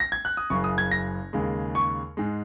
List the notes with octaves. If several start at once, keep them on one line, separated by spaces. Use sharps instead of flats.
A#6
G#6
F#6
D#6
F#1 F#2 C#3 C#6
D#6
G#6
A#6
D#2 C#3 G#3
C#6
G#2 G#3